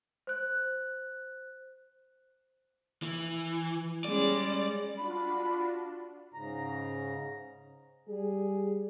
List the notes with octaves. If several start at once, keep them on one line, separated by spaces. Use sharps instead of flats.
C5 F#6
E3
G3 G#3 C#4 D5
D4 F4 F#4 B5
G#2 C#3 A#5
G3 G#4